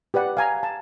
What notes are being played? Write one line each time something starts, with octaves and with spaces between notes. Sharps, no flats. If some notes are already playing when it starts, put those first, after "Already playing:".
G4 B4 D5 F#5
F5 G#5 A#5
A5